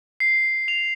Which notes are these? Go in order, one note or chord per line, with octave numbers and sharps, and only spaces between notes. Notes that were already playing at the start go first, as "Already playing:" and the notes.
C7
F7